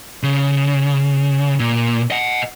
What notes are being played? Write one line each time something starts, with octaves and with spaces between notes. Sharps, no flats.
C#3
A#2
D#5 F#5